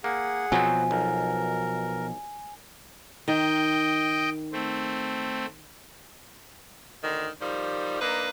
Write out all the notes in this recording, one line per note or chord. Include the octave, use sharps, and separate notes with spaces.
A#3 G#4 F#5
B2 F3 F#3 B3 C4 G#5
B1 A#4
D#3 D#5 G5
A3 C4
D2 D3 D#3
D#3 F3 G3
A#3 D4 D#4 B4